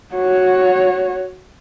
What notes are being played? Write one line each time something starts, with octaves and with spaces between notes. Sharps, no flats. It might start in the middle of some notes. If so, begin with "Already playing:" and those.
F#4 C#5